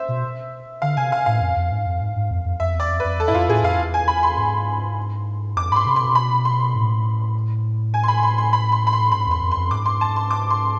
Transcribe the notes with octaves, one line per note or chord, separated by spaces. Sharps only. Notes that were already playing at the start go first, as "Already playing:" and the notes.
Already playing: C5 E5
B2
D3 F5
C3 G#5
F5
A2 F5
F2
F2
G#2
F2
G#2
G#2
F2
F2
F2 E5
E2 D5
F2
F2 B4
E2 A4
G#2 E4
F2 F4
A2 G#4
F2 F5
E2
G#5
B5
C6
G#2
F2 D6
G#2 B5 C6
C3
B2 C6
B5
C6
A2
G#5
C6
B5
C6
C6
B5
C6
B5
C6
G#2 B5
E2 C6
F2
C6
F2
G#2 D6
C6
A5
C6
D6
C6